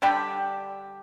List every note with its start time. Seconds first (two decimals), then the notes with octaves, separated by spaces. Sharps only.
0.02 D3 G3 D4 G4